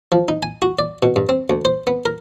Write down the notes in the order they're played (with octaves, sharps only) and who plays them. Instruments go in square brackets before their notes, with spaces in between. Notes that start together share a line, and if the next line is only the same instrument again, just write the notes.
[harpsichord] F3
D#4
G#5
F#4
D5
B2
G2
C4
D2
C5
B3
A#4